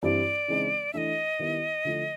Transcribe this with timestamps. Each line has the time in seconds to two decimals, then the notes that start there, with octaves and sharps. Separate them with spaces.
0.03 G2 E3 G3 C4 E4 D5
0.48 C#3 E3 G#3 C4 D#4
0.93 E3 A3 D4 D#5 E5
1.39 D#3 G3 B3 E4
1.85 D3 F3 A3